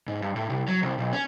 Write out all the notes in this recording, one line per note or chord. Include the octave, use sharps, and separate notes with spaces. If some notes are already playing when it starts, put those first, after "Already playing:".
G#2
G2
A2
C2
F#3
C2
B1
C#4